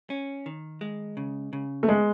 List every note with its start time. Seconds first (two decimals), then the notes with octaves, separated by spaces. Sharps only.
0.10 C#4
0.46 D#3
0.81 G#3
1.17 C#3
1.53 C#3
1.83 A3
1.88 G#3 B3